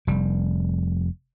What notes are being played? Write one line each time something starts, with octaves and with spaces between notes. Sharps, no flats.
F1 G3